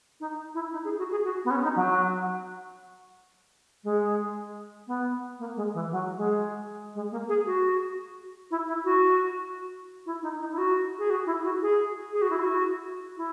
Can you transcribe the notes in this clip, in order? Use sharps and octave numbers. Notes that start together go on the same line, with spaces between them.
D#4
E4
D#4
G#4
F#4
G#4
F#4
B3
C#4
D#4
F#3
G#3
B3
A#3
G#3
E3
F#3
G#3
G#3
A#3
G#4
F#4
E4
E4
F#4
E4
D#4
D#4
E4
F#4
G#4
F#4
E4
F#4
G#4
G#4
F#4
E4
F#4
E4